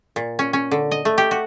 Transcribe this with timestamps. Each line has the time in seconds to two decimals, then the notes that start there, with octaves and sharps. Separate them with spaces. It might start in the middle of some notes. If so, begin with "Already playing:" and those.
0.16 A#2
0.39 C#4
0.53 C#4
0.71 D3
0.91 D#5
1.05 A3
1.18 G4
1.31 F#4